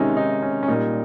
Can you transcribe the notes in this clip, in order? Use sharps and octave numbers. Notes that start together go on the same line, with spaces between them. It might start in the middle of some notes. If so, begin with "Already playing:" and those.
Already playing: C3 D#3 G#3 C#4 D#4
D#4
C#4
C#4
A#2 G3 D#4